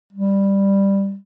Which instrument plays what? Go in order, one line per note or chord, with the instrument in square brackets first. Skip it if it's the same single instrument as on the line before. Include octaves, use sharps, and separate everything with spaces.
[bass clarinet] G3